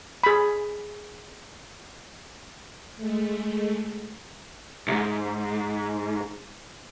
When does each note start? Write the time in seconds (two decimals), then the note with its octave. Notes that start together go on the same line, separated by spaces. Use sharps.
0.23 G#4 B5
2.97 G#3 A3
4.88 C2 G#2